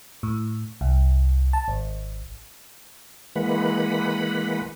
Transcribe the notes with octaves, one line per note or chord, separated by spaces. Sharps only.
A2
C2
A5
G#1
E3 G#3 A#3 B4 F#5 B5